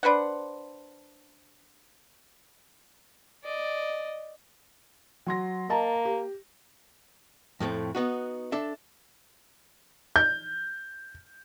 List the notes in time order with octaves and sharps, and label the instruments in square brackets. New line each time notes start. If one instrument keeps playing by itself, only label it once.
[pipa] D4 B4 C5 F#5
[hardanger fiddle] D5 D#5
[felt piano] F#3 C6 A#6
[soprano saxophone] A#3 [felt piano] D#5 A5 A#5
[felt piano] G4
[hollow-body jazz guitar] F2 A2 A3 C4
B3 D#4 F#4
D4 A4 E5
[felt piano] G6